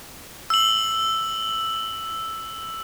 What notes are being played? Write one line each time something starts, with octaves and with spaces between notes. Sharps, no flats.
E6 F#7